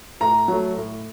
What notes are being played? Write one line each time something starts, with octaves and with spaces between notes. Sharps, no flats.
A2 A#5
F#3 A3
A2